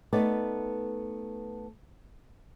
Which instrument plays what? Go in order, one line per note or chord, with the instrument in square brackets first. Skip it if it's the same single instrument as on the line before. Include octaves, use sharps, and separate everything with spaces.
[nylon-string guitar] A3 B3 D#4 B4 D5